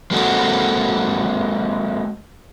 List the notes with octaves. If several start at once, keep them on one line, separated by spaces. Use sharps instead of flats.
G#3 A#3 C4 F#4 A4